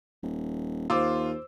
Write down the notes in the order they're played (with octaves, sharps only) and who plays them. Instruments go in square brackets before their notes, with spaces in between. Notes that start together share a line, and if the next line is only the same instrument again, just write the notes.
[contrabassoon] D#1
[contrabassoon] D#2 [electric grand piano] F4 [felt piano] C5 D6 E6